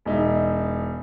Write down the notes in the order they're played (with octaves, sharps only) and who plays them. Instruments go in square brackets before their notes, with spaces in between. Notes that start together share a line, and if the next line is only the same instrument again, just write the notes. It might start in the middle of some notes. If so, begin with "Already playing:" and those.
[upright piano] E1 D#4 E5